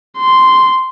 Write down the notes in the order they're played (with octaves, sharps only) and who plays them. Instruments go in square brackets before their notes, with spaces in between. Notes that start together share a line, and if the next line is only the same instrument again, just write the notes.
[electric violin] C6